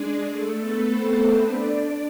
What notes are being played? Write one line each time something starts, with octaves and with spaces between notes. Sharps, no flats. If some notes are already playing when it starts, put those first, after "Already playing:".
Already playing: G#3 D4 G#4 D5
A3 A4
B3 B4
C4 C5
D4 D5
D4 D5